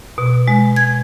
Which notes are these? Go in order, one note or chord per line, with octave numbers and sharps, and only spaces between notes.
B2
G#3
G#6